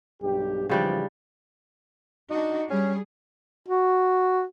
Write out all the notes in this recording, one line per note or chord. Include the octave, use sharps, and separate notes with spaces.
B1 G2 G4
G#1 C#3 E3 F3 G3 D4
D4 D#4 F#4
G3 C#4 G#4
F#4